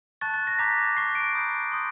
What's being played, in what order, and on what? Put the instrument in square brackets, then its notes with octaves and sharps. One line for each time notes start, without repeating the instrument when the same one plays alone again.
[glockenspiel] A5 C#6 F#6 A6
A6
A#6
A#5 D6 G6 B6
A#5 C#6 F#6 C7
D7
B5 D#6 G6
C6 D#6 G6